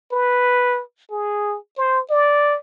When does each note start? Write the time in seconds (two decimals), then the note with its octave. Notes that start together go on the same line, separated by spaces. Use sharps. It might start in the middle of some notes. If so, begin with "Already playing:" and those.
0.12 B4
1.11 G#4
1.78 C5
2.10 D5